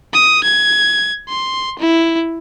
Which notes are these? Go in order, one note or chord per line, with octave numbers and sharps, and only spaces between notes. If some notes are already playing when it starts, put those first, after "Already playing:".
D#6
G#6
C6
E4